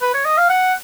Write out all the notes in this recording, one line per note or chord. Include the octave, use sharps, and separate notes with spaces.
B4
C#5
D#5
F5
F#5